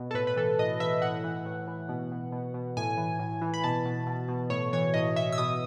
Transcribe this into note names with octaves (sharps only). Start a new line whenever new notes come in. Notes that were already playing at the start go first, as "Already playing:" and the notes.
Already playing: B2
A4
A2 B4
B4
E3 A4
A2 D#5
E3 E5
A2 F#5
E3
A2
E3
B2
B2
B2
B2
A2 G#5
E3
A2
E3
B5
B2 A5
B2
B2
B2
A2 C#5
E3 C#5
A2 D#5
E3 E5
E6
B2 D#6